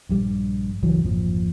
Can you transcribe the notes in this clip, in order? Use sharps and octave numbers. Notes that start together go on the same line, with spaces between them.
A#1 G2 G3
G1 C#2 E3 F#3
G#1 F2 A#2 F3